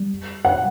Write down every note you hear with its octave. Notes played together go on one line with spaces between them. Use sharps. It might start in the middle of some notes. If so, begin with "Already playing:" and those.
Already playing: G3
F#5